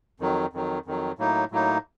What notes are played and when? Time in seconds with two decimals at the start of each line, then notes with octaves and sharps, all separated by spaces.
0.20 F2 D#3 F#3
0.53 F2 D#3 F#3
0.86 F2 D#3 F#3
1.19 A2 F#3 A#3 D#4
1.51 A2 F#3 A#3 D#4